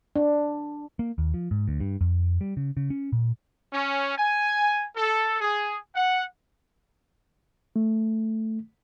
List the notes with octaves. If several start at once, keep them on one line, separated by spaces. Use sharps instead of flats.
D4
A#3
D#2
F3
G#2
D2
G2
F2
G3
C#3
C#3
C#4
A#2
C#4
G#5
A4
G#4
F#5
A3